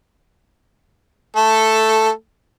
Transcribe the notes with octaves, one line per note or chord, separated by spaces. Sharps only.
A3 A4